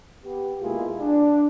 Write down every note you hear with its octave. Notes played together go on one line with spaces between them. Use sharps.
B3 G4
B2 G#3 A#3 E4 F4 G#4
D4